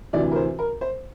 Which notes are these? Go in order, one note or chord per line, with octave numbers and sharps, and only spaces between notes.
D2 C3 E3 D5
A#4
C5
A#4
C5